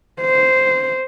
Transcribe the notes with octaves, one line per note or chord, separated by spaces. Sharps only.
C5